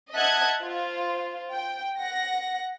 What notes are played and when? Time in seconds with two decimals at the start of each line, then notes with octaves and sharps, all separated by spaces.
0.13 D#5 E5 F#5 A5 F#6 G#6
0.61 F4 C5
1.53 G5
1.99 F#5 A#6